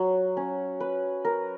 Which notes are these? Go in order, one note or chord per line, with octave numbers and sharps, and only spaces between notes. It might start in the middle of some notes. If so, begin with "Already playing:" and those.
Already playing: F#3
C#4
B4
A#4